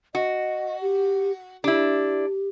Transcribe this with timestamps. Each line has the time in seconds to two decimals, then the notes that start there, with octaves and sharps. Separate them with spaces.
0.15 F#4 D#5
0.81 G4
1.64 D4 E4 G4